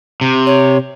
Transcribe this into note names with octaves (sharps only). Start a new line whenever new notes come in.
C3
C#5